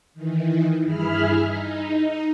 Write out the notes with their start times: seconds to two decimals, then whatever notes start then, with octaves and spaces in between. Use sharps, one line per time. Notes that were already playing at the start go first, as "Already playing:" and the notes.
0.14 D#3 E3
0.85 G2 E4 G#4 E5 B5 F6
1.42 D#4